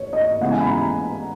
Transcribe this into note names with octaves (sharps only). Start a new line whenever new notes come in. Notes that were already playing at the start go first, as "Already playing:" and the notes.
Already playing: C#5
D#5
C#3 E3 G#3 B3 F#5
G#5
B5
A#5